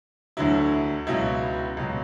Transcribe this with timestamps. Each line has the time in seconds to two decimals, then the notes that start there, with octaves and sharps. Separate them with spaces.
0.37 D2 D3 F#3 E4
1.07 C#2 B2 F#3 E4
1.77 C#2 B2 F#3